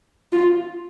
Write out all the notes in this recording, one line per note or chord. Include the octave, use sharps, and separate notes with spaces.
F4